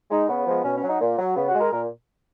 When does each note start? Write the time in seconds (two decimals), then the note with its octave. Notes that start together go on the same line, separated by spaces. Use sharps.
0.11 G#3 D#4
0.29 C#3 B3
0.46 F3 G#3
0.64 B2 C#4
0.77 C#4
0.83 F#3
0.89 D#4
1.01 A#2
1.18 F#3
1.36 C#3 B3
1.49 F#4
1.55 G#3
1.61 A#4
1.73 A#2 A#4